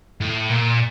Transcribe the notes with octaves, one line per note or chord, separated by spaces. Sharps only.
A2
A#2